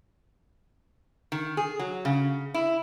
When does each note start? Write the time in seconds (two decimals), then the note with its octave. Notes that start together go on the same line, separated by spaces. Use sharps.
1.32 D#3
1.57 G#4
1.79 F#3
2.05 C#3
2.54 E4